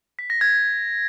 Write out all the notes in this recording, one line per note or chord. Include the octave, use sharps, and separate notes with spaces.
B6
A#6
G#6